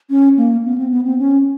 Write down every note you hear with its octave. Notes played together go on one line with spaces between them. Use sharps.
C#4
A#3
B3
C4
B3
C4
C#4